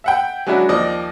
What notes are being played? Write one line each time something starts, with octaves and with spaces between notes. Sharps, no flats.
E5 F#5 G5
F#3 G#3 C#4 D4 E4 F#4
D#2 F3 D5 D#5